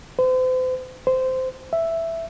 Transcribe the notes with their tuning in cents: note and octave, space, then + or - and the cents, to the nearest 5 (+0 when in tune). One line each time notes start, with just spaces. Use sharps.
C5 -40
C5 -15
E5 +5